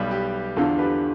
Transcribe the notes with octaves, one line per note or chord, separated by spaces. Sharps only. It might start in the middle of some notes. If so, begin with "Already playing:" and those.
Already playing: B1 B2 G3 B4
G4
E2 D3 F3 F4 A4
G4 B4